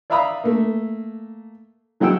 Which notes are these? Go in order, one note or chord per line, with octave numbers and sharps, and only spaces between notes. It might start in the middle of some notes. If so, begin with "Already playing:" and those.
D5 E5 F5 A#5 B5 D#6
A3 A#3
E3 F#3 G#4 F#5 G5 E6